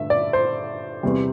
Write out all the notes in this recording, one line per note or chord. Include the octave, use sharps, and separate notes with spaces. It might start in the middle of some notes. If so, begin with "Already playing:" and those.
Already playing: G2 D3 A3 E5
D5
C5
E2 C3 G3